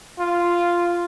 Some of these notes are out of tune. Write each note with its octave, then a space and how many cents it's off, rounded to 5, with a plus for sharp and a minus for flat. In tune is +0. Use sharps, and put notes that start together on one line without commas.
F4 -5